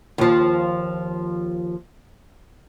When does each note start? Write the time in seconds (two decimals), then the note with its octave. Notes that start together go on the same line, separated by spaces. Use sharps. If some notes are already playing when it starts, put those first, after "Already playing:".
0.18 D#2 F3